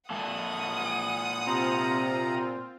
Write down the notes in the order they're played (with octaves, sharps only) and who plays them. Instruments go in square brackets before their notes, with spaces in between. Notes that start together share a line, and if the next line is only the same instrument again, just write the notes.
[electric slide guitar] A#2 A#3 A4 [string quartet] F#5 D#6
[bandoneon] C3 A#5 [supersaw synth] C4 F4